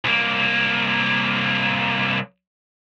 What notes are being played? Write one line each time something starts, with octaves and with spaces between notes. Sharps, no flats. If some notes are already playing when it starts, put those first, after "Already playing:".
C2 A#3